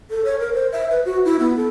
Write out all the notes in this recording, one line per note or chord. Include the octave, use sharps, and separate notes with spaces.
A4
C#5
A#4
C5
E5
B4
F#4
E4
B3
A4